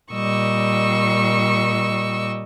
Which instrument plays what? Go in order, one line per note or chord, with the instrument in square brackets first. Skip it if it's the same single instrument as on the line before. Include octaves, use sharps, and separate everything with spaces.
[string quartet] A#2 G3 D#5 C#6 E6